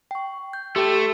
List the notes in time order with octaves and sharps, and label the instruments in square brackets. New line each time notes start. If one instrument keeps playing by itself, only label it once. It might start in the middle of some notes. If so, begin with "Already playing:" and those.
[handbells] G5 C#6
G6
[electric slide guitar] A3 [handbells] G4 A4 G5